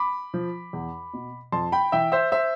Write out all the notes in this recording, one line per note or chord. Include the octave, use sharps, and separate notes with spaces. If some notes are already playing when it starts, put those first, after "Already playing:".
Already playing: B5 D6
F3
E2
B2
F2 A5 C6
G5 B5
E3 E5 G5
C5 E5
C5 E5